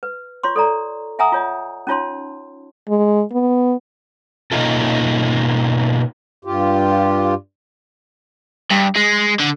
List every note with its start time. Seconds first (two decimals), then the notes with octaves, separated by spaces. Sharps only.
0.03 B4
0.43 F4 C#5 C6 C#6
0.56 A4 D5 A#5
1.19 E5 F#5 G#5 A#5 D#6 E6
1.32 F4 C#5 D#5
1.87 C#4 D#4 F4 C#5 A5 C6
2.89 G#3
3.32 B3
4.52 B2 A#3 C#4 D#4 F4 A4
6.45 G2 F4 G4
8.71 G2
8.95 G#3
9.40 D3